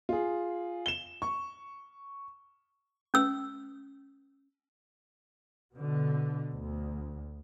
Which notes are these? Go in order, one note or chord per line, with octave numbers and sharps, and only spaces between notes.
F4 G#4
E7 G7
C#6
C#4 E6
B2 D3
D2